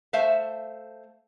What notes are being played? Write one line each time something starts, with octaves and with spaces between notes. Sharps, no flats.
A3 C5 E5 F5